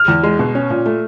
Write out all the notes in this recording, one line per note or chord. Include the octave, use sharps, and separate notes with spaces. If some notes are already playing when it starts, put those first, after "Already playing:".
Already playing: F6
E2
G#3
B2
C#4
A#2
A3